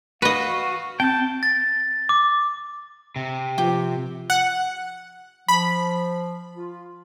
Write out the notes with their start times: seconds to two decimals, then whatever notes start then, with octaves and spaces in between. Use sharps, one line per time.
0.22 F#4 B4 D#5 F5
1.00 C4 G5 A5 G6
1.43 A6
2.09 D6
3.16 C3
3.58 F3 G4
4.30 F#5
5.48 F3 B5
6.56 F4